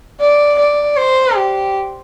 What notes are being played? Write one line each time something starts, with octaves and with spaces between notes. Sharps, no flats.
D5
D5
C5
G4